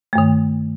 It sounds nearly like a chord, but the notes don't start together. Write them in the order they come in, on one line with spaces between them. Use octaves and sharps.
A3 G2 D#3